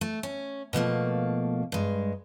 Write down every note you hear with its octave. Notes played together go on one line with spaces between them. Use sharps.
A3
C#4
B2 F3 A3 A#3
G2 G#3